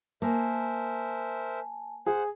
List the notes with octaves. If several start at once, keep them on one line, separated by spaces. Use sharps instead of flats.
A#3 A#4 C5 E5 G#5 A5
G#4 C5 F#5